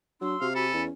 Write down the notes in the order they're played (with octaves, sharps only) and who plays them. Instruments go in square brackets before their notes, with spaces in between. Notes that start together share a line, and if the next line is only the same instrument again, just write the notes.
[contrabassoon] F#3 [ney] D4 [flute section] C6 E6
[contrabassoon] C3 [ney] F#4 [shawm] F5
[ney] F#4 [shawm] A4 [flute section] G#5 B5
[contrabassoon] E2 [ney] C#4